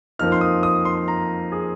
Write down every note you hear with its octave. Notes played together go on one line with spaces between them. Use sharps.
F2 F3 A#3 D#4 F6
C6
D#6
D#6
C6
A#5
G#4